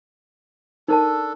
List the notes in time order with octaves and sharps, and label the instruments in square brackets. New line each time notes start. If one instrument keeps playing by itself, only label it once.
[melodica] D4 A4 [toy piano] D#4 A#4 A5